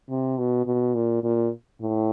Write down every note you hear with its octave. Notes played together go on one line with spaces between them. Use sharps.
C3
B2
B2
A#2
A#2
A2